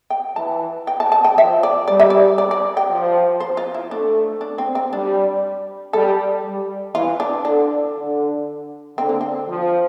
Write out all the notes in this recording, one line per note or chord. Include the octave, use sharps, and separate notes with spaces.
G5
E3 A5
G5
A5
A5
G5
F3 E5
D5
G3 D5
E5
D5
D5
D5
G5
F3
C5
F4
E4
A3 D4
D4
C4
C4
G3 D4
G3 A4
G3
E3 F4
D4
D3 D4
D3
D3 C4
A#3
C4
F3